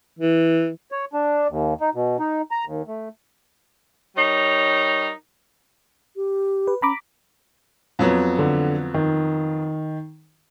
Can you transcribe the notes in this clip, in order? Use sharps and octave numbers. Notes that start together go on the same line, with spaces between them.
E3
C#5
D4
D#2
D#4
B2
D#4
A#5
D#2
A3
G3 D#4 A#4 C#5
G4
B4
C#4 A#5 B5 D6
F2 F#3 B3
D3
D#3